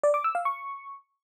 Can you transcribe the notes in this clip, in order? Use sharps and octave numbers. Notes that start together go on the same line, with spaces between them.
D5
D6
E6
F5
C#6